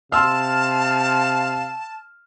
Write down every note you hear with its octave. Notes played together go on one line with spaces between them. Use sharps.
C3 F5 A5 C6 E6 F6